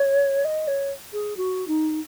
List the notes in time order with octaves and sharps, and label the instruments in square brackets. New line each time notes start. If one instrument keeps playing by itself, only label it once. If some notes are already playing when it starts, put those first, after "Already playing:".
Already playing: [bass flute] C#5
D#5
C#5
G#4
F#4
D#4